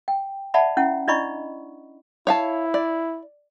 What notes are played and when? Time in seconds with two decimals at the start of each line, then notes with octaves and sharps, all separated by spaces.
0.08 G5
0.54 D5 E5 F#5 A5 B5
0.77 C#4 E4 F#5
1.08 D4 E4 D5 D#5 B5 C#6
2.27 E4 C#5 F5 A5
2.74 D5